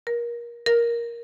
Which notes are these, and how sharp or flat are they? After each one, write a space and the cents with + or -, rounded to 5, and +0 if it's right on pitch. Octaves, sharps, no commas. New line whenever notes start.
A#4 +25
A#4 +10